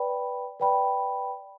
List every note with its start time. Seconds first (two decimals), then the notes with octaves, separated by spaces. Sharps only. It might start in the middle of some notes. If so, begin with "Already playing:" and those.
Already playing: B4 D5 G5 B5
0.60 B4 D5 G5 B5